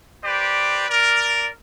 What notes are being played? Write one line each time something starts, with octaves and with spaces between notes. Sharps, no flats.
G4 B4 C5 D5
A#4 D5